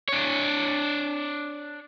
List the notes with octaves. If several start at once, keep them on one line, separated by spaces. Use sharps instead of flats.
D4 C#5